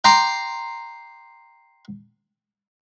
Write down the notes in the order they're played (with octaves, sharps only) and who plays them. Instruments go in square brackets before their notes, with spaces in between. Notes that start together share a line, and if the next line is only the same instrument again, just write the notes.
[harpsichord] G5 A#5 C6 D6